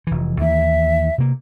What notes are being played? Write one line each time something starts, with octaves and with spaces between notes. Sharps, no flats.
F1 E3
D#2 E3 A#3 E5
C3 A#3